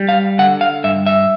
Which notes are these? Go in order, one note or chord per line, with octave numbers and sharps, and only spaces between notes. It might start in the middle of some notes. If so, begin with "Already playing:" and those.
Already playing: G3
F5
D3 F#5
F5
G2 E5
E5